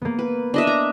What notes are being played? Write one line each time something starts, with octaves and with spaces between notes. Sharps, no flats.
A#3 B3
B4
D4 D#5 E5
A#5